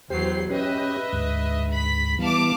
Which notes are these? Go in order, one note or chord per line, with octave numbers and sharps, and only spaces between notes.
E2 F#3 G4 C5 C7
C#4 G4 B4 D#5 E5
D2 G#2
B5 B6
E3 G3 B3 F5 A5 D6